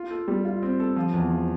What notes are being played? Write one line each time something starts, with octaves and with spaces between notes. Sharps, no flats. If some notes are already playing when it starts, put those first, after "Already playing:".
Already playing: F4
A4
G3
F4
C4
A4
F3
E2
F3